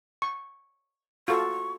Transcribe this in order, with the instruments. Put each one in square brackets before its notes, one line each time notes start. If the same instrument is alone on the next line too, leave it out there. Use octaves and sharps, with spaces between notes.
[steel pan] C#6
[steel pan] F4 F#4 A4 [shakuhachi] C#6